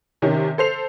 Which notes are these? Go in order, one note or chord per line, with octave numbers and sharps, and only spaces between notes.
C3 D#3 C#4
A4 C5 C7 F7